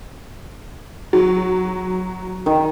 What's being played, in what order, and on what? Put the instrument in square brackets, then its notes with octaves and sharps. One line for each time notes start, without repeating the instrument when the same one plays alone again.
[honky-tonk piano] F#3
[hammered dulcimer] D#3